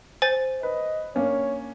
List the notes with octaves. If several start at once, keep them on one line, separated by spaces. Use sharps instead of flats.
C5 G#5 A6
B4 D#5
A#3 C#4 D4 C#5